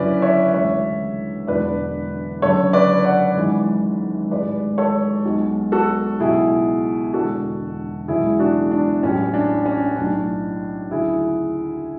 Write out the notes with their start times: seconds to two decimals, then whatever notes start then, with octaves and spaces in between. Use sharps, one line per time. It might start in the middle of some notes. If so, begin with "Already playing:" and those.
Already playing: F#1 F#2 D3 F#3 C#4 E4 B4 D5
0.22 C#5 E5
0.53 D2 C#3 E3 G#3 C#5 E5
1.47 E1 E2 D3 F#3 B4 D5
2.42 F#1 F#2 D3 A4 C#5
2.73 B4 D5
3.05 D5 F#5
3.36 G#1 F#2 E3 G#3
4.31 A1 G#2 G#3 B4 D5
4.78 A4 C#5
5.25 B1 B2 G#3
5.72 F#4 A4
6.20 C#2 B2 F#3 E4 G#4
7.13 E1 E2 D3 F#4 A4
8.08 F#1 E2 B2 G#3 E4 G#4
8.39 D4 F#4
8.71 D4
9.03 A1 A2 F#3 C#4
9.34 D4
9.66 C#4
9.97 B1 A2 F#3 D4
10.91 D2 C#3 F#3 E4 G#4